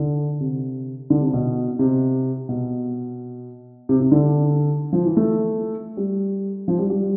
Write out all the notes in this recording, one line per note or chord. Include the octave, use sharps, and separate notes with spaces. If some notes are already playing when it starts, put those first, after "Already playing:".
Already playing: D3
C3
D3
C3
B2
C3
B2
C3
C3
D3
F3
E3
A3
G3
F3
G3
G3